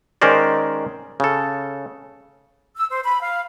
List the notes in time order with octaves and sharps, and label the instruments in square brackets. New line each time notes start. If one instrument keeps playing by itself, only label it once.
[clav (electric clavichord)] D#3 G#3 C#4 A#4 C5 D5
C#3 A4
[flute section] E6
C5
B5
F5